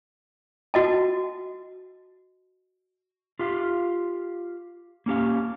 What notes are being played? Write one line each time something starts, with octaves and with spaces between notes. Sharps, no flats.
F#4 D#5 A5
F4 G4 F5
A#3 C#4 G4 F5